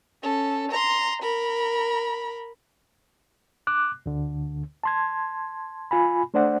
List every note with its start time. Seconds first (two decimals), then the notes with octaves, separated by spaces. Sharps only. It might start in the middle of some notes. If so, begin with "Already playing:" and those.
0.23 C#4 A4
0.71 A#5 C6
1.22 A#4 B5
3.67 D6 F#6
4.06 D2 D3
4.84 A5 C6 G#6
5.91 F4 G#5 B5
6.34 A3 D4 C5 D5 F#5